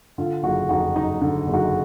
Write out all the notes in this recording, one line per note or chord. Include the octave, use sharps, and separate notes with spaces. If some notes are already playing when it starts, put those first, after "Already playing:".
D3 F4
F#1 D#4 F#4
F2 D#4 F#4
F#3 D#4
D3
F#1
D#4 F#4